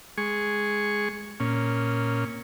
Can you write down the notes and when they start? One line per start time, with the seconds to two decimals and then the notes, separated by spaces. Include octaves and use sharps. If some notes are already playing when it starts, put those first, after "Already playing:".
0.18 G#3 G#4 C#6
1.40 A#2 C#4